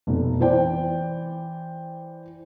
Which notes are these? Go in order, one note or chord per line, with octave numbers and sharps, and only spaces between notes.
F1 B2
E3 C5 D5 G5